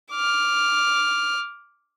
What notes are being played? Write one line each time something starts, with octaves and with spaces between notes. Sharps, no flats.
D6 F6